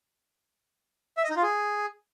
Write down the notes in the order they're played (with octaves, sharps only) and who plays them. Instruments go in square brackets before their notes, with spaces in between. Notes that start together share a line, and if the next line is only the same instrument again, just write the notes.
[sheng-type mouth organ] E5
D#5
D#4
F4
G#4